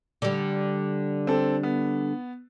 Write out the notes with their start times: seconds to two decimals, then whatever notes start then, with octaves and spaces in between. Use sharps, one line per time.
0.22 D3 G3
1.27 C4 A4
1.63 B3